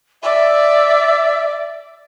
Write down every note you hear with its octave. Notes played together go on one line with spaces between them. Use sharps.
D5 E5